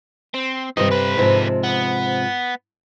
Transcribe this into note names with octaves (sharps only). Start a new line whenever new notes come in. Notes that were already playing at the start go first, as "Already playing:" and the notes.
C4
G2 C3 D#3 G3 D#5
D3 B4
G#2 C3 F3
B3